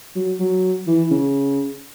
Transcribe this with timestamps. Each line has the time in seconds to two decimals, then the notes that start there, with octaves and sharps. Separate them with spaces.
0.15 F#3
0.40 F#3
0.87 E3
1.11 C#3